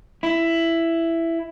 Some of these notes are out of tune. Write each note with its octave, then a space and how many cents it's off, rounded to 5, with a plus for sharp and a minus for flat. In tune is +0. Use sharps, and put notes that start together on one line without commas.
E4 +10